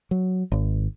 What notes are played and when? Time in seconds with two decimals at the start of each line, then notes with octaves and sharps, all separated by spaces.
0.11 F#3
0.52 G#1